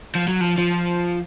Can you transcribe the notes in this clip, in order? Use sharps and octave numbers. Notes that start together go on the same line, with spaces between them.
F3
F#3
F3
F3